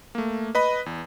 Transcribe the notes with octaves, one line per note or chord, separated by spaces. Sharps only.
A3 A#3
B4 D#5 B5
E2